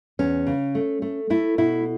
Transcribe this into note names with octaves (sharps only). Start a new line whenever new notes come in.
E2 C#4
C#3
A3
A3
A3 E4
B2 E4